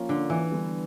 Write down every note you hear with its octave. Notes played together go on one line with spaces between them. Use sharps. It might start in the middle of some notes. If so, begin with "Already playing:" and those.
Already playing: F3 A#3 C#4 F4
D3
E3
D3 G3 B3